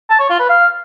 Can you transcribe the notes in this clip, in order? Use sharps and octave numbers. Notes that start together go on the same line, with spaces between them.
A5
C#5
F4
B4
F5